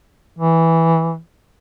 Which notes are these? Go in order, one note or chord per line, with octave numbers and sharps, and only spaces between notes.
E3